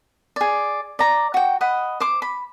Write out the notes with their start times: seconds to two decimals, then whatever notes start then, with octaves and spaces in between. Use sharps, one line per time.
0.36 G#4 D5
0.99 D5 A#5
1.34 F#4 G5
1.61 D#5 F#5 B5
2.00 C5 D6
2.22 B5